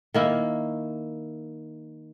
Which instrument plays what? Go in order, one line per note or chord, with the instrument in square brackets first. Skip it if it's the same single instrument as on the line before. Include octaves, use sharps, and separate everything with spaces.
[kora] D#3 A#3 E4